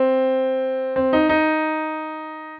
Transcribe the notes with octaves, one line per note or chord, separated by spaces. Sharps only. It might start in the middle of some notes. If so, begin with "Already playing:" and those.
Already playing: C4
C4
D#4
D#4